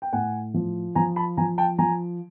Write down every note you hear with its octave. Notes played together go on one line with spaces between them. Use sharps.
G5
A2 F#5 G#5
F3
F3 G#5 A#5
A5 B5
F3 G#5 A#5
G5 A5
F3 G#5 A#5